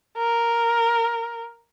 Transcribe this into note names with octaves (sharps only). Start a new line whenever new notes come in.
A#4